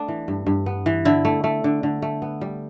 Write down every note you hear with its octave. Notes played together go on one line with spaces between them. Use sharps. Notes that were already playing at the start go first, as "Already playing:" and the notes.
Already playing: A3 B3 D4
E3
G2
G2
B3
E3
D3 E4
A3
A3
D3
D3
A3
B3
G3